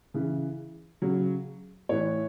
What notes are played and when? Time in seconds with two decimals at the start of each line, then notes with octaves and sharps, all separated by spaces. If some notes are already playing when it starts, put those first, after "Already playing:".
0.14 C#3 E3
1.02 C#3 F#3
1.89 A2 E3 C#5